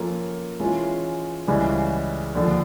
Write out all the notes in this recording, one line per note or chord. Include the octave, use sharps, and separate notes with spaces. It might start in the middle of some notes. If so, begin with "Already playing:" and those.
Already playing: F3 A#3 C#4 F4 A4
E3 G#3 C#4 F4
C#2 C#3 E3 G3
D#2 D3 F3